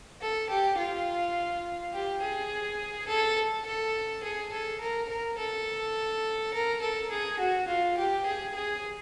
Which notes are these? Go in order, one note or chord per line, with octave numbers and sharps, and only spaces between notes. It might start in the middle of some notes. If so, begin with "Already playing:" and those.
A4
G4
F4
G4
G#4
A4
A4
G#4
A4
A#4
A#4
A4
A#4
A4
G#4
F#4
F4
G4
G#4
G#4